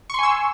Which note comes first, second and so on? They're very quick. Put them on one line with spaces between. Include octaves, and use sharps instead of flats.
C#6 C6 G#5 E6